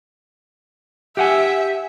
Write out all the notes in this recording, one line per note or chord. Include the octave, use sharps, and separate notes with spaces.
G4 E5 F#5 G#5